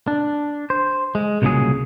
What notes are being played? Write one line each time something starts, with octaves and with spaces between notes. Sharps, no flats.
D4
C5
G#3
C2 A#2 C#3 E3 F#3 G#4